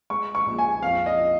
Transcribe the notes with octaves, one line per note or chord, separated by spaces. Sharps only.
G#3 C#6
C#6
A#1
G#5
F2 F5
D#5